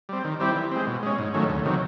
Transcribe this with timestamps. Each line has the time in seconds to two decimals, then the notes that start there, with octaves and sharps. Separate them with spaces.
0.09 G3 C4
0.24 D#3
0.40 G3 C4 E4 G4
0.56 E3
0.71 G#3 C4
0.87 B2
1.03 G#3 C#4
1.18 G#2
1.34 D#3 F#3 A3 C#4
1.49 D2
1.65 C3 D#3 F#3